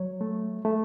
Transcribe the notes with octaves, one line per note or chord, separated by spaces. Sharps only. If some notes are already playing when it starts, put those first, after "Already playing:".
Already playing: F#3 C#5
A3
A3